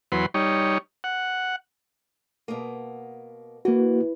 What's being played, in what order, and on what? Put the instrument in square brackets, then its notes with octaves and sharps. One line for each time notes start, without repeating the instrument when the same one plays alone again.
[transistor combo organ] E2 F#3 B4 C6
G3 D#4 C#5
F#5
[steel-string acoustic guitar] B2 A#3
[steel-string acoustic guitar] E3 [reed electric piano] A#3 F#4